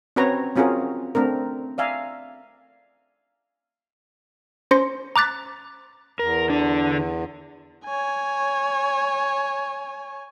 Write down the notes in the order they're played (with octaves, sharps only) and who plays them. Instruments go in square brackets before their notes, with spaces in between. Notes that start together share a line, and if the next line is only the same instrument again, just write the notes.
[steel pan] C4 C#4 F#4 B4 C#5 A#5
C4 C#4 F4 F#4 G#4 A#4
A3 C4 D4 A#4
D5 E5 F5 G#5 A#5
[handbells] C#4 C5 C6 A#6 C#7
A#5 D6 F#6 A6 B6
[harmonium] E2 [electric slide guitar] A#4
[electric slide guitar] D3 D4
[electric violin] C#5 G#5